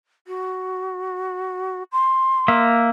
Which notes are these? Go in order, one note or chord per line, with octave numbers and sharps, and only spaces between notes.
F#4
C6
A#3 E5